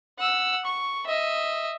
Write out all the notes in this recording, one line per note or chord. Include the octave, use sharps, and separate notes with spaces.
F#5 E6
C#6
D#5 E5